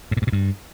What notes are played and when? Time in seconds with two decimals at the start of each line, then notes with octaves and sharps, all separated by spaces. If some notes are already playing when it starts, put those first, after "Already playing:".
0.11 G#2
0.17 A#2
0.22 G#2
0.27 B2
0.32 G2